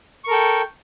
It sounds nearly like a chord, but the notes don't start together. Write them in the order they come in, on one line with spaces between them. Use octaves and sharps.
C#6 A#4 A4 G5